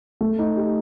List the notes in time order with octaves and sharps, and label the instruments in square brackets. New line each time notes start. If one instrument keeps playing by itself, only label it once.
[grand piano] A3
D#4
G4